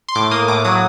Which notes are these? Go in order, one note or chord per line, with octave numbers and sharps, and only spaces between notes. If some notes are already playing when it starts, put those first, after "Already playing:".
C6
A2 D6
A#3 D#6
A2 D6
F#3 D#6